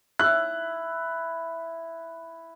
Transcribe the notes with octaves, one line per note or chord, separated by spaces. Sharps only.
E4 F#6